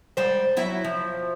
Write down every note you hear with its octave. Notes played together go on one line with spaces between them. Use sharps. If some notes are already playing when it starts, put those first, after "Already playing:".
G#2 G3 C5
F#3 E4
F3